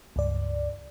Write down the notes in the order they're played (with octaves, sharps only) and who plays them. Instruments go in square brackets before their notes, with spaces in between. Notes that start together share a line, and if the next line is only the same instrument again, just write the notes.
[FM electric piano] C#2 G2 D5